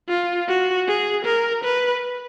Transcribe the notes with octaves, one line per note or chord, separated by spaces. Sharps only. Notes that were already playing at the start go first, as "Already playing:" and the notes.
F4
F#4
G#4
A#4
B4